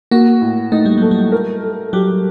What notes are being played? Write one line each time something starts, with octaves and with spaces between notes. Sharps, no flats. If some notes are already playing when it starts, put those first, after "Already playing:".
A#3 F#4
A2
A3 D#4
G3
F#3 A3
G3
A#4
A3
F#3 G4